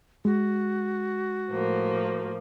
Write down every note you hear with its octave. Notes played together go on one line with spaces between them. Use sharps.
G#3 F#4
A2 F3 A#3